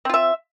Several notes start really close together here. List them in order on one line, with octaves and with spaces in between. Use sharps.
C4 F4 E5